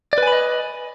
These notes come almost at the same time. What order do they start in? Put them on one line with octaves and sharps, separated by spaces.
D5 B4 G#5 B5 D#5